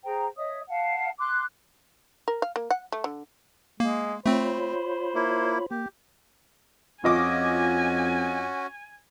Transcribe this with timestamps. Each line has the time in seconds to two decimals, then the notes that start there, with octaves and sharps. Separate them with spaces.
0.03 G#4 C5 G5 A#5
0.36 C#5 D#5 E5 D#6
0.68 F5 F#5 A5
1.19 C6 D6 F#6
2.28 A#4
2.42 F5
2.56 A#3
2.71 F#5
2.92 A3
3.04 D3
3.80 G#3 A#3
4.26 A3 C4 F4 C5 C#5 B5
5.15 A#3 E4
5.71 A#3 G4
7.04 F2 C#4 F4 F#4 D#5 G#5 D6